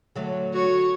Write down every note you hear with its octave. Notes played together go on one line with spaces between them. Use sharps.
D3 F#3 A3
F#4 C#5